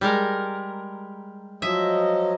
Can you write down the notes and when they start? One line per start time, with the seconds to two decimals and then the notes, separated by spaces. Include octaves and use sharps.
0.01 G3 G#3 A#4
1.62 F3 F#3 D#5 E5